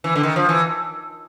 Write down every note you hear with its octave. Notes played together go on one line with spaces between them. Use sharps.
E3
D3
D#3
F3
E3